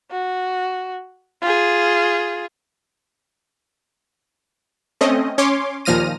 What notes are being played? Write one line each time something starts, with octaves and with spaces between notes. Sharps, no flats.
F#4
F4 G#4
A3 C4 C#4 D#5
C#4 C#5 C6 D6
D#2 A#2 F3 F6 A#6 D#7